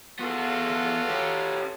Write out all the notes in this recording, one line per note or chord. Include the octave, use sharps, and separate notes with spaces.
B3 F4 F#4 G#4 A4
C#4 G4